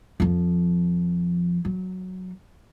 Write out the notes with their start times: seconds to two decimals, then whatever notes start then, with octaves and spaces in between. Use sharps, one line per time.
0.20 F2 F3
1.65 F#3